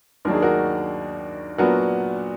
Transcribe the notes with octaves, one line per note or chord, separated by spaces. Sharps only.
D#2 D#3 F#3 A#3 D4 A#4
G#4
F#4 A#4
A#2 F#3 B3 D4 F#4 A#4